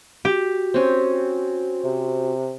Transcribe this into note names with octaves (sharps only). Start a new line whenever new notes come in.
F#4 G4
C4 C#4
C3